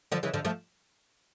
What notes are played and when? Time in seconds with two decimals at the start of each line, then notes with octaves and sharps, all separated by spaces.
0.12 D3 F3
0.23 C#3 E3
0.34 D3 F3
0.45 F3 A3